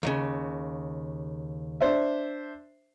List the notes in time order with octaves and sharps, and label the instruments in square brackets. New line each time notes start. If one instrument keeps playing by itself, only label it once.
[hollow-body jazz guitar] D#2 A2 C#3
[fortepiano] D4 C5 E5